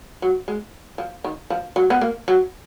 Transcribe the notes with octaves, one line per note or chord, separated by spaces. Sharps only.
F#3
G#3
F3
D#3
F3
F#3
B3
A#3
F#3